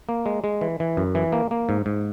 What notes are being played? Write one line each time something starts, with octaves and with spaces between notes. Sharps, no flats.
A#3
G#3
G#3
E3
E3
F#2
E3
A#3
A#3
G#2
G#2